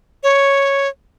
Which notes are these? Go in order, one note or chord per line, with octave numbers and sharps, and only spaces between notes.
C#5